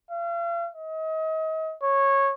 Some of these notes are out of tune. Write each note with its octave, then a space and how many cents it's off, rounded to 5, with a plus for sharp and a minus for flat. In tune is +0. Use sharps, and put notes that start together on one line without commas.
F5 -40
D#5 +35
C#5 -15